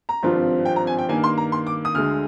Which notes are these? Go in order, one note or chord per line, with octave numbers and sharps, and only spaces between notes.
A#5
G#1 G2 F3 C4 F4
G5
A#5
G#5
G5
G2 D#3 A#3 G#5
C6
A#5
C6
D6
D#6
D2 D3 G#3 F6